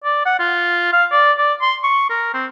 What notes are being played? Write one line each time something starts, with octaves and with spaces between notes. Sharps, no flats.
D5
F#5
F4
F5
D5
D5
C6
C#6
A#4
C4